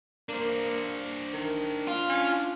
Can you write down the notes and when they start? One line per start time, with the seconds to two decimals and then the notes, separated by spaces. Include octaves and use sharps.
0.29 A#3 D4 C5
1.33 D#3
1.88 F4
2.10 C#4